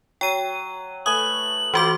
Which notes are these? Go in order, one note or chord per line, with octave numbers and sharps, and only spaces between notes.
F#3 G5 D#7
A3 B4 G#5 D#6 F#7
E3 F4 F#4 C5 D6